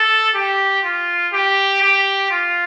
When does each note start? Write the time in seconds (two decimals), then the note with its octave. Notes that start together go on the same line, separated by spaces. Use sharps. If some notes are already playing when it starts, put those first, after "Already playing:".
Already playing: A4
0.35 G4
0.84 F4
1.33 G4
1.82 G4
2.31 F4